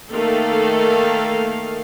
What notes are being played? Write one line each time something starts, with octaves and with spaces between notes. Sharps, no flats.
D#3 A3 A#3 A4 F5